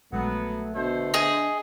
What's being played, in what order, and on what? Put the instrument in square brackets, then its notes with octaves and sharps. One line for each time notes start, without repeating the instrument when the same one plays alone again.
[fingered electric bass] A#1 G#3 [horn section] F#3 B3 [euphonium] A3
[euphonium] B2 [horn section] D3 A3 C5
[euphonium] D4 [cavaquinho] G#4 D#5